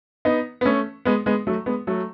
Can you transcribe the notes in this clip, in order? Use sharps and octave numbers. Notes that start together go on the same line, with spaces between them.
B3 D#4
B3
A3 C#4
G#3 B3
G#3 B3
F#3 A3
G#3 B3
F#3 A3